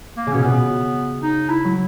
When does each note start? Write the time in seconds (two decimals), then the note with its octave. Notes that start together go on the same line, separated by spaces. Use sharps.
0.17 A#3
0.27 C#3
0.32 B2 C#4
0.43 B2 B3
0.52 C#3
1.23 D#4
1.49 E4
1.65 F#3